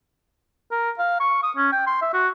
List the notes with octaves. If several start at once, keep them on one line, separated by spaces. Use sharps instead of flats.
A#4
F5
C#6
D#6
C#4
G5
C6
E5
F#4